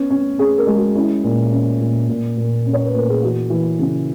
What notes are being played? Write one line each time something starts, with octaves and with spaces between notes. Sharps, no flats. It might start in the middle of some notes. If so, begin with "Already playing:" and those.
Already playing: B3 C#4
C#4
C#4 G#4
A#4
G#3
F#4
C#4 E4
A#2
C#4
A#2
A#2
A#2
C#4
C#5
B4
A#2 A#4
G#4
E3 F#4
E3
C#3